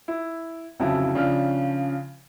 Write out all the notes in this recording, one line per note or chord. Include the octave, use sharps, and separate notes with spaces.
E4
D1 F2 C#3 F#3 E4 A5
C#3 F3 D4 F6